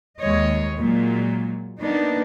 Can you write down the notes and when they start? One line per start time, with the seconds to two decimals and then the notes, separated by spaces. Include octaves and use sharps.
0.20 D#2 G#3 C#5 D#5
0.77 A#2 F#3 G#3
1.81 A#3 B3 D4 D#4